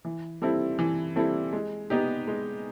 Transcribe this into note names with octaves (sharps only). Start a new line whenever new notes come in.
E3
G3 C4 E4 A4
E3
G3 C4 E4 A4
G#3
B3 D#4 G4
G#3